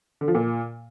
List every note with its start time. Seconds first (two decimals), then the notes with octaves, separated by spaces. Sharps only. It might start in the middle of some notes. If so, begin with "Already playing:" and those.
0.21 D3
0.28 F3
0.35 A#2